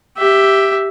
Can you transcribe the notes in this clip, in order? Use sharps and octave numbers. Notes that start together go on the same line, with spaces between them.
G4 E5